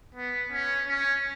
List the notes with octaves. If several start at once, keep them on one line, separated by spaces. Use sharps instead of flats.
B3
C#4
C#4